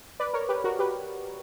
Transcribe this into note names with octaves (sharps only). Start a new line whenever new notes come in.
B4 D5
A#4 C#5
G4 B4
F#4 A#4
G4 B4